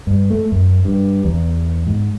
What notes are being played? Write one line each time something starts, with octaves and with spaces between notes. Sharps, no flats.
G2
A3
F#2
G2
E2
G#2